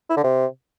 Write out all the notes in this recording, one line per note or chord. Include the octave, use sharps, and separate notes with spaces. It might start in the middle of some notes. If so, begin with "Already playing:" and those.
E4
D3
C3